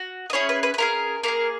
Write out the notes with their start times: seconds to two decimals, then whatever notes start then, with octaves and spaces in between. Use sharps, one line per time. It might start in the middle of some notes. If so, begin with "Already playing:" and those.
Already playing: F#4
0.30 D#5
0.33 C#4 E4 G#4 C#5
0.49 B4
0.63 B4
0.74 B4
0.78 C#4 E4 G#4 A#4
1.23 A#3 E4 A#4
1.28 G#4